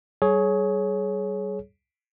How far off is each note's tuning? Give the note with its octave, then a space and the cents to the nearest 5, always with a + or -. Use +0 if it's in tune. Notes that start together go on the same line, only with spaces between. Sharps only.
G3 -20 G#4 +25 C#5 +0